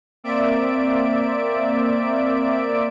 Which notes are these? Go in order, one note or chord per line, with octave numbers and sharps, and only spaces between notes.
A#3 C4 D5 E5 D7